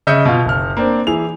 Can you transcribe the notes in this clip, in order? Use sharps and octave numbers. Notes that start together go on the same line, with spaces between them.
C#3 D#5 E5 D#6 G6 C#7
B2 B3 F4 F5
F#1 F6
A#3 C4 D4
E3 G#4 F7